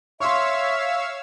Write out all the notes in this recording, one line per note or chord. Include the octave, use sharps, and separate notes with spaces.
C#5 E5 F5 C6 C#6 E6